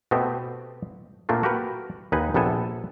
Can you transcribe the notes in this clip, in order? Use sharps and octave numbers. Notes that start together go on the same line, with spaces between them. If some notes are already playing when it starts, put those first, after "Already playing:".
B2 A3 B3 C4 G4
A#2 A3 A#3 C4 D4 F4
F#4 G4 A#4 B4
D#2 D#4 B4 G#5
A#1 C3 B3 A4 G#5